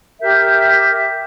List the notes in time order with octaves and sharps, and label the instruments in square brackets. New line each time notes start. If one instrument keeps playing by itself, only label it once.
[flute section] G4 A#4 E5 G6